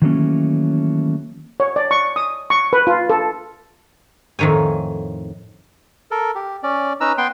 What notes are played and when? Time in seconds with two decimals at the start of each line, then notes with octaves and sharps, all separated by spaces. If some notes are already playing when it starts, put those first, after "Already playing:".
0.02 D#3 E3 F#3 A3 A#3 C#4
1.60 C#5
1.76 D5
1.91 C#6
2.16 D#6
2.50 C#6
2.73 B4
2.87 F4
3.10 A4
4.39 F2 A2 D#3 C#5 G#5
6.11 A4 A#4
6.35 G4
6.63 C#4 D5
7.01 C#4 D#4 B4 A#5 E6
7.18 B3 B4 G5 C6